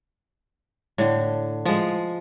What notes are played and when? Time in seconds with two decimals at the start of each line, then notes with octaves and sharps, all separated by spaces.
0.98 A2 D3
1.65 F3 G#3